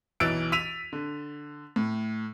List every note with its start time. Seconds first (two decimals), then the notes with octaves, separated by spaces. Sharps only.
0.20 B1 E3 E6 A6 D7
0.52 E6 B6 D#7 F7
0.93 D3
1.76 A2